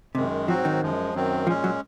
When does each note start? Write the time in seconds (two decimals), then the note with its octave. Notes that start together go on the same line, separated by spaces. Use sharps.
0.15 F#2 C3 D#3 G#3
0.48 G#2 F3 F#3 C4 F#4
0.65 D#3
0.81 F#2 F3 G#3
1.14 F#2 D#3 F#3 C4
1.47 A#2 F3 G#3 C#4
1.64 F#3